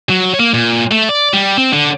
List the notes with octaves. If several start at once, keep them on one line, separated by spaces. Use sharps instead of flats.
F#3
A#3
A#2
A3
D5
G3
C4
D3